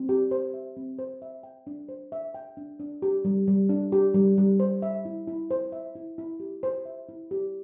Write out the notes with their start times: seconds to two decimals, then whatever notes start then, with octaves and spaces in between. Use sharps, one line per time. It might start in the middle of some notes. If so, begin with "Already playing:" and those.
Already playing: C4
0.09 G4
0.31 C5
0.54 E5
0.77 C4
0.99 C5
1.22 E5
1.43 G5
1.67 D4
1.89 C5
2.12 E5
2.35 G5
2.57 D4
2.80 D4
3.02 G4
3.25 G3
3.48 G3
3.69 D4
3.92 G4
4.14 G3
4.38 G3
4.60 C5
4.82 E5
5.05 E4
5.27 E4
5.51 C5
5.72 E5
5.95 E4
6.18 E4
6.40 G4
6.63 C5
6.85 E5
7.09 E4
7.31 G4